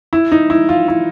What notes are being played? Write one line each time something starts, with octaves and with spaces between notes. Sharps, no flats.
E4
D#4
E4
F4
E4